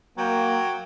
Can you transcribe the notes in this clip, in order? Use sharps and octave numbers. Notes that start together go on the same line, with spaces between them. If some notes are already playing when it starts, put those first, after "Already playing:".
F#3 A#3 G5